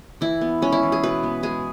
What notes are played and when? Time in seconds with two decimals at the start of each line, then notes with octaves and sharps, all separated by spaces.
0.21 E3 E4
0.41 B3
0.62 G#3 C#4
0.72 E4
0.83 E3
0.92 G#4
1.03 B2 B4
1.23 B3
1.43 G#3 G#4